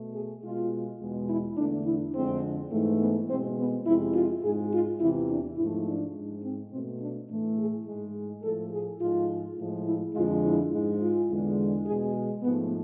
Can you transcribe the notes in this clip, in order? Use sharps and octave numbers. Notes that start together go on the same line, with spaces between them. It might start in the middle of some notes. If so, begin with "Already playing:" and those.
Already playing: B2 A3
G#4
B2 G#3 F4
E2 B2 G#3
E4
E2 D3 A3 D4
E4
F2 D3 G#3 C4
G#2 E3 A3
B3
B2 G#3 C4
B3
F2 C3 G#3 E4
F4
G#2 G#3 G#4
F4
E2 C3 E3 E4
D4
G#2 F3 A3 E4
D4
G#2 G#3
C4
B2 A3 C4
D4
A2 E3 A3
G#4
G#2 G#3 G#4
A2 F3 A3 A4
G#4
G#2 F3 G#3 F4
A2 F3 G#3
E4
F2 D3 F3 G#3 F4
E4
G#2 G#3
F4
E2 D3 G#3
B2 G#3 G#4
G#2 F3 A3 B3